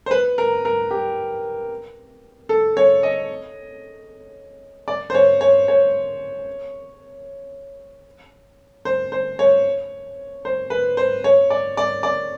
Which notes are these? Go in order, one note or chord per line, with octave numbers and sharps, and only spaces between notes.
C5
B4
A#4
A#4
G4
A4
C#5
D#5
D5
C5
C#5
C#5
C#5
C5
C5
C#5
C5
B4
C5
C#5
D5
D5
D5